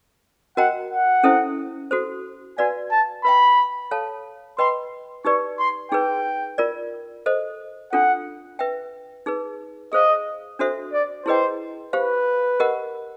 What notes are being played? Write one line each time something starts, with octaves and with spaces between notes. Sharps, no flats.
F#4 A#4 D#5 F#5 G5 A#5
F#5
C#4 E4 A4 C5 E5
F#4 A4 C5
F#4 B4 D5 F5 G#5
A5
B4 E5 G5 B5
A4 C#5 F5 A5
B4 D#5 G5 B5 C6
D#4 G4 B4 D5 C#6
C6
D#4 G#4 B4 G5
F4 A#4 D5
A4 C5 D#5
D4 F4 A4 F#5
B4 E5 G5
D#4 G#4 B4
G#4 C5 D#5 F5
D4 F#4 A4 C5 E5
D5
E4 G#4 B4 C5 D#5 G5
G4 B4 C5 F5
G4 A#4 D#5 F#5